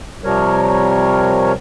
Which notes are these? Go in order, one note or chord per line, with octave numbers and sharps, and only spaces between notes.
C3 F3 G3 A#4 C#5